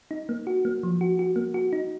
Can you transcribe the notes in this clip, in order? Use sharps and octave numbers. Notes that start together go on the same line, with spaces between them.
D#4
A#3
F#4
A#3
F3
F#4
F#4
A#3
F#4
D#4